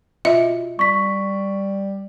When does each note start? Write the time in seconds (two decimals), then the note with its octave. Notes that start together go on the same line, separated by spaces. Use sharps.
0.25 B2 F4 D#5 E5
0.79 G3 C#6 B6